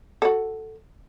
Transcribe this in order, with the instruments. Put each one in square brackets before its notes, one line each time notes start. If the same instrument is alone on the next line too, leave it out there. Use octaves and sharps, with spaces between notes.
[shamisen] F#4 A4